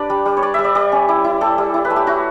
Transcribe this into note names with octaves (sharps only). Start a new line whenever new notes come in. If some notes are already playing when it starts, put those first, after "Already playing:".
Already playing: D4 G4 B4 D5
G3
G3
C#5
G3 D5
G3 E5
D5
G3 D5
C#4
E4 D5
E4
G3 A4
G3
E4
B4
A3
G4
E4 F#4